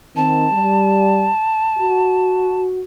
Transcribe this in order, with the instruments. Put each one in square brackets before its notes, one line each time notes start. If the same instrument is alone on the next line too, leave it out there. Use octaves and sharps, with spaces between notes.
[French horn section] D#3 C4 [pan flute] A5
[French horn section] G3
F#4